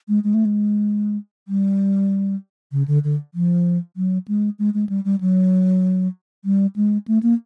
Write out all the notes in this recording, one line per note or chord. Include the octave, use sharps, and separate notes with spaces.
G#3
G#3
A3
G#3
G3
C#3
D3
D3
F3
F#3
G#3
G#3
G#3
G3
G3
F#3
G3
G#3
A3
A#3